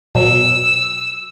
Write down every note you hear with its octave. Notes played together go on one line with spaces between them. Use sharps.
B2 F#3 E6